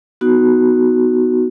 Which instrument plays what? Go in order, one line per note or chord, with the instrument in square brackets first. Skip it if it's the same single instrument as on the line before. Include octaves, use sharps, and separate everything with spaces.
[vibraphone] B3 D#4 F#4